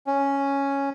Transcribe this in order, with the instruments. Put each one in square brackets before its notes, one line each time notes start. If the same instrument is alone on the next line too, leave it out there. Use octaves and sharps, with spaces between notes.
[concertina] C#4